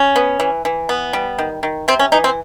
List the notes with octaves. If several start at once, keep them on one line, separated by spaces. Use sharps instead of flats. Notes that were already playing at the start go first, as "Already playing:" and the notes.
Already playing: C#4
B3
E3
E3
B3
G3
D#3
D#3
C3 C4
C#4
E3 D#4
C4